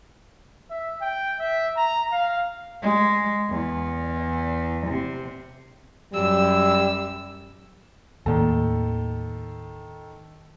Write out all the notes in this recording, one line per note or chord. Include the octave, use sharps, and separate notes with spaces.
E5
G5
E5
A#5
F5
G#3
E2
C3
F#2 G3 E6
D#2 A2 D#3 A#3 A4